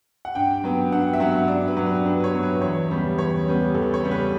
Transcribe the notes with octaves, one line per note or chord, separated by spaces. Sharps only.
F#5
G2 G5
F#3 B3
G2 F#5
E5
F#3 B3 F#5
G2 D5
B4
F#3 B3
B4
G2 B4
B4
C#5
F#3 B3
B4
E2 C#5
C#3 G3 B3
E2 C#5
C#3 G3 B3
E2 A4
C#5
C#3 G3 B3
B4